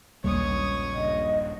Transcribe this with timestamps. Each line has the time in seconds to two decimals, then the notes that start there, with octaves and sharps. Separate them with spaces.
0.24 A#1 D#2 C#3 G3 G#3 C#4 C#5 D#6
0.93 D#1 G2 D#5